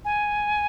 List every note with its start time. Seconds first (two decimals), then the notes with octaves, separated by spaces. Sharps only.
0.05 G#5